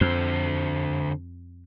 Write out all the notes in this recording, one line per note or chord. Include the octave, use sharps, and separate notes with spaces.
F2 D3 C5